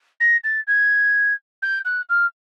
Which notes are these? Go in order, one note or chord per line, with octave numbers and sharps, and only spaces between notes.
A#6
A6
G#6
G6
F#6
F6